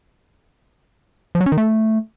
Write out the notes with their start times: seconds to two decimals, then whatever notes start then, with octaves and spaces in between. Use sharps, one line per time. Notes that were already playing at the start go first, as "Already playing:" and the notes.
1.35 F3
1.41 F#3
1.46 C#4
1.52 D#3
1.58 A3